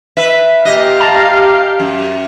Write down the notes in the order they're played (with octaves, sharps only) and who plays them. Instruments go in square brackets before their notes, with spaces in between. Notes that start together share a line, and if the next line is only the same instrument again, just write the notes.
[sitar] B4 E5
[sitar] A#2 D#5 [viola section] G4 [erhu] F5
[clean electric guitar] A5 A#5
[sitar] F#2